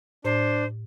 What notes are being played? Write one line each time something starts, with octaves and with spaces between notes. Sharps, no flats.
A2 D4 C5